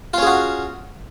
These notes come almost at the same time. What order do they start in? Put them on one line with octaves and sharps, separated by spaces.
F4 C#4 G#4 F#4